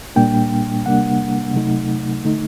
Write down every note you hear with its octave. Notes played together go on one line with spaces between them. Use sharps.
A#2 G3 A#3 D4 G5
C3 G3 A#3 D4 F#5
C3 F#3 A3 D#4
D3 A3 D#4